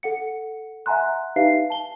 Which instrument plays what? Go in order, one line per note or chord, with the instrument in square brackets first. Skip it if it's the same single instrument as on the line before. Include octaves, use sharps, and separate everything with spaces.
[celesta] A4 F#5 C#7
E5 F#5 G#5 A#5 C6 F#6
D#4 G4 B4 E5 F5 C7
A5 G7